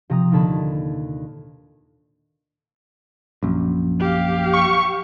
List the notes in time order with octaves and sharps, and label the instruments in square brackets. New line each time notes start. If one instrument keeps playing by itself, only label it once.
[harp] C3 F3 A#5 D#6
D#2 A#2 D3 A5 B5 G#6
[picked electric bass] A#1 F#2
[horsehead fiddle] G4 F5
[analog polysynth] C#6